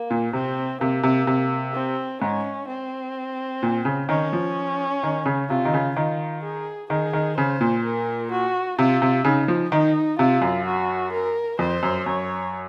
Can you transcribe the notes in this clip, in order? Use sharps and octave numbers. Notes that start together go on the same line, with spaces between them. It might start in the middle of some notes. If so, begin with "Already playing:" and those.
Already playing: A#3
A#2
C3 C4
C3 A#3
C3
C3
C4
G#2 C#4
C4
A#2
C#3
D#3 C#4
F3
D#3
C#3
C3 F4
D#3
C#3
D#3 F4
G#4
D#3 G#4
D#3
C#3 C5
A#2
A#4
F#4
C3 F4
C3
C#3 D#4
F3
D#3 D#4
C3 F4
F#2
F#4
A#4
F2 C5
F#2
F#2 C#5